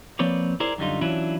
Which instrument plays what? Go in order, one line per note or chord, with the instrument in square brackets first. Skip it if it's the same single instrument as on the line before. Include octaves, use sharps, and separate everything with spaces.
[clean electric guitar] F3 A#3 C4 B4 C#5 D5
E4 G#4 A#4 C5 D5
F#2 D3 G3 D#4 F4
E3 F#3 C#4 D4 E4 F4